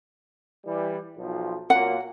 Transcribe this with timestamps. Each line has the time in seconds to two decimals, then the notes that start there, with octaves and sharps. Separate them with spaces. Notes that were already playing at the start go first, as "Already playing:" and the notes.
0.66 E3 G3
1.17 B1 F3
1.70 A#2 F#3 A#3 F#5